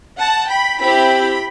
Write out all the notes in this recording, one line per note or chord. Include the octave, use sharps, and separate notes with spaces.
F#5 A5
G5 B5
C4 E4 G4 G5 B5